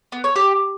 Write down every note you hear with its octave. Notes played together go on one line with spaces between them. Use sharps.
B3
C#5
G4